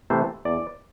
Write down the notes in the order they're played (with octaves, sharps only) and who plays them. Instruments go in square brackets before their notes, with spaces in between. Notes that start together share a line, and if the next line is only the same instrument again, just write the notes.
[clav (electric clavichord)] C3 E3 A3 C5
E2 D5